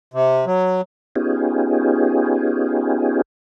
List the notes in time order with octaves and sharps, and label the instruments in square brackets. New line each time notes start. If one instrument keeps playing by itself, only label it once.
[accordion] C3
F#3
[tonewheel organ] B3 C#4 D#4 F4 G4 G#4